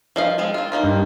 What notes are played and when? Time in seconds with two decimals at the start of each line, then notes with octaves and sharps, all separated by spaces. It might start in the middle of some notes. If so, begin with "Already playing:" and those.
0.16 F3 D#5 F5
0.38 F3 G#3 C4
0.54 C4 F4
0.72 A#3 D#4 F4
0.84 G2